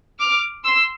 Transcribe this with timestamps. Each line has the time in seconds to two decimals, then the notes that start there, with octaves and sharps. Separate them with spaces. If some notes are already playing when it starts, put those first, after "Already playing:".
0.19 D6 F6
0.65 C6 E6